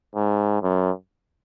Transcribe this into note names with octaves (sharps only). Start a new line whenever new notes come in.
G#2
F#2